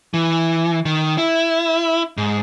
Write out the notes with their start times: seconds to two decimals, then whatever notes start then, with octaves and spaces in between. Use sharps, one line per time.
0.14 E3
0.85 D#3
1.18 E4
2.17 G#2